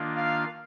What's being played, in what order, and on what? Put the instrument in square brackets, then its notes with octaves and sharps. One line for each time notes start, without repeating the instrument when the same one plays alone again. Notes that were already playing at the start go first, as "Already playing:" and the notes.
Already playing: [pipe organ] D#3 A#3 D4 F4
[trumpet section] F5